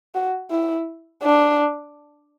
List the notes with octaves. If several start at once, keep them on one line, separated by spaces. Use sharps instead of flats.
F#4
E4
D4